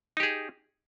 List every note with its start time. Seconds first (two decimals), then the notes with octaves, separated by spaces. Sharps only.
0.17 D#4
0.20 G4
0.23 G#4